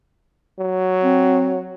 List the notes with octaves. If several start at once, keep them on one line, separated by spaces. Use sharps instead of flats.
F#3
C4